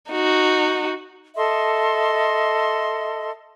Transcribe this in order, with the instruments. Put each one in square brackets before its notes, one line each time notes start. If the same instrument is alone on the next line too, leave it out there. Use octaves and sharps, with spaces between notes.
[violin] D#4 F#4
[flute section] A4 D#5 E5 C6